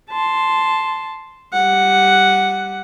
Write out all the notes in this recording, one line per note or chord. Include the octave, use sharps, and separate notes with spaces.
A5 C6
G3 F#5